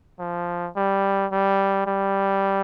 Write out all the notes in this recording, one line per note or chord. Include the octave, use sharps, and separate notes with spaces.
F3
G3
G3
G3